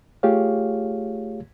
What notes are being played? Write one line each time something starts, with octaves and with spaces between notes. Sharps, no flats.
A3 F4 G4 G#4 C#5 F5